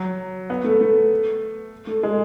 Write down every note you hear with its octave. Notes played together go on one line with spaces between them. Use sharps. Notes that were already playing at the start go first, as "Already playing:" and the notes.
Already playing: F#3
B3
A3
A3
A3
G#3